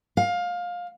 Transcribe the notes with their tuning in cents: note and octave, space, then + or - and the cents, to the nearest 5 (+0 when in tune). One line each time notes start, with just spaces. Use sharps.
F5 +20